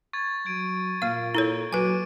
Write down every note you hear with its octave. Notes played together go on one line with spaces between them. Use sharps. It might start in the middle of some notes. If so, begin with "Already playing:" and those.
C#6 G#6 A6
F#3 G#6 D7 D#7
A#2 A#3 F5 C#6
E4 A4 C#5
F#3 B4 G#5 D6 D7 D#7